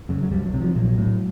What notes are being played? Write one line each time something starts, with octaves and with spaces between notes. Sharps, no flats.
F#2 C#3
F#3
C2 G3
F#3
C3
F3
A#1 F#3
A2